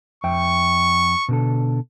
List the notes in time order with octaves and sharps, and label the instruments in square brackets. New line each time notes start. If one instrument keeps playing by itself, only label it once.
[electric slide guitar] F2 E5 G5 [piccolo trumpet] C#6
[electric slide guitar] B2 D3 A4